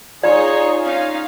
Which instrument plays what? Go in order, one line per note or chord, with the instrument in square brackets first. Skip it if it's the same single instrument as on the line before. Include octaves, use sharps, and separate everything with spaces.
[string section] D#4 G#4 [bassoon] F4 [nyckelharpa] C#5 [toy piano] D5
[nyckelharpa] C#4 D#4 [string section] F5